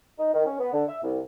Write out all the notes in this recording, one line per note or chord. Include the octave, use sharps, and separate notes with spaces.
D#4
D#3
C#4
B3
D3
E5
C2